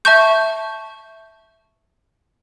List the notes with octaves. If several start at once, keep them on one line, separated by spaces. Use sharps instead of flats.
E5 A5 C#6 G6